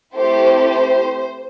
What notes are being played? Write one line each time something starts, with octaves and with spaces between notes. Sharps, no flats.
A3 C4 E4 G4 C5
C5